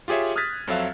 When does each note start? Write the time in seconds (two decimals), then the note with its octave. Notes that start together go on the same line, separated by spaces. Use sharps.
0.08 F4 G4 G#4 C#5 E5
0.36 D#6 F6 F#6 G#6 A6 B6
0.67 F2 F#3 C4 A4 E5 F5